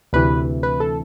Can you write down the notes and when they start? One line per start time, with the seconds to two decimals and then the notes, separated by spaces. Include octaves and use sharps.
0.13 D2 C3 E3 B4
0.63 B4
0.80 A4